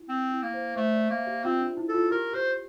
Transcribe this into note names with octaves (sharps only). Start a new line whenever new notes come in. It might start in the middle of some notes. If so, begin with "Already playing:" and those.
Already playing: E4
C4
E4
A#3
C5
A3 C5
D5
A#3 E5
G4
C4 F4
D4
E4
A4
F4
G4 A#4
G4 C5